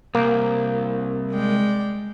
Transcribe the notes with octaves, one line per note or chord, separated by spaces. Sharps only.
C2 A#3
G#3 D5 G5